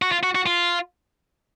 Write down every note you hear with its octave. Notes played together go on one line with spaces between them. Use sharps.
F#4
F4
F#4
F#4
F4